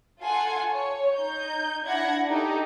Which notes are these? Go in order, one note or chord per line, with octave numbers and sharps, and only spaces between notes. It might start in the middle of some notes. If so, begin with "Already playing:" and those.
F4 A4 F#5 G#5 C6
C#5
D#4 G6
D4 E4 F#5 G#6 A#6
D#4 G4 A4